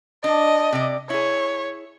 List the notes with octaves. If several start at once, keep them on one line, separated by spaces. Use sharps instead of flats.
D4 D#5
C3 D5
E4 G#4 C#5